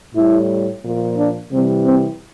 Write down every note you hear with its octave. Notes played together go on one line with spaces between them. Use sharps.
A2 G3 E4
A#2 F3
D4
C3 E3 G3 C4
C4